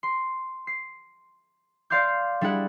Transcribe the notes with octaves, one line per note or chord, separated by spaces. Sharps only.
C6
C7
D5 F5 C6 D6 G6
G3 D4 E4 G#4 F#5